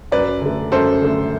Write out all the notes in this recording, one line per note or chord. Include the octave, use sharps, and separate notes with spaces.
F#2 B4 D5
D3 A3
F#2 A4 C5
D3 A3